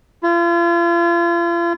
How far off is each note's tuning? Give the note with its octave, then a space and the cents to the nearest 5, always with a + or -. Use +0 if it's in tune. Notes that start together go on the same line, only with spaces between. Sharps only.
F4 -40